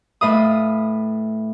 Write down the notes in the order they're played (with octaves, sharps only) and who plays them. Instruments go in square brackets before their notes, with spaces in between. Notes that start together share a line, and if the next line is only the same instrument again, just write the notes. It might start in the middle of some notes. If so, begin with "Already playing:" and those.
[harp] A2 B4 F5 D#6